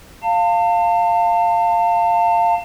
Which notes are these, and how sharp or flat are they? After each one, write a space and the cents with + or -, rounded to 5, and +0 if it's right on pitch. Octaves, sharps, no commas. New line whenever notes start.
F5 +0 A5 +35